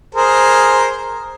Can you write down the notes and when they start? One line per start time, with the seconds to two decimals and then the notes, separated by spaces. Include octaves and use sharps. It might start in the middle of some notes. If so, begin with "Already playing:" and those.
0.15 G#4 A#4 C5